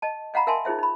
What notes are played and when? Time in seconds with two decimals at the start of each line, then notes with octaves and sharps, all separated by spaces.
0.02 D#5 A5
0.34 D#5 F5 F#5 A#5 B5
0.47 A#4 E5 F5 G#5 A5 C6
0.65 D#4 F4 G#4 C5 E5
0.79 D#4 B5